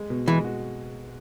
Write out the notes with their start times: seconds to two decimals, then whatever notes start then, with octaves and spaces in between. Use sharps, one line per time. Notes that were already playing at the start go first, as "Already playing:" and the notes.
Already playing: G#3
0.10 B2
0.28 E3 G#3
0.44 F#4